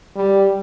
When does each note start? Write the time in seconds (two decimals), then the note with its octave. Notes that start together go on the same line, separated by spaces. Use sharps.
0.16 G3